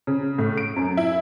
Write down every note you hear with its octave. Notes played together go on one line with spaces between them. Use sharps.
C#3
A2
D7
F#2
E4